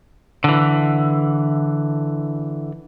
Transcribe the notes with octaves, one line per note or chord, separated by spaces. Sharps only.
D3 E3